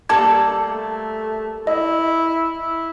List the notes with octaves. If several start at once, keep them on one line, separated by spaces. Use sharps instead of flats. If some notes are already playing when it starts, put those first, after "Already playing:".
G3 A#3 A4 A5 D6 G#6
A3
E4 D#5
E4